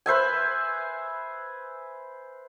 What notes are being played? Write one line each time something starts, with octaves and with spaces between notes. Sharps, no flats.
B4 C5 E5 G#5